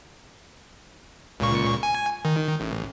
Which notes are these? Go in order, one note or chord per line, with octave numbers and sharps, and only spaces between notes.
C#2 A#2 C#6
G#5
D#3
A1